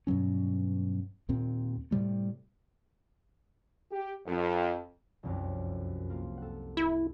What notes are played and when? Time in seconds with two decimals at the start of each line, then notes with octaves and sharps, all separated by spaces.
0.07 G2 B2 F#3 C#4
1.29 D#2 A#2 C4
1.91 A2 C3 G3 A3
3.92 G4
4.26 F2
5.23 F1 C2 F#2
6.10 A#3 F4
6.38 A4 F#5
6.77 E4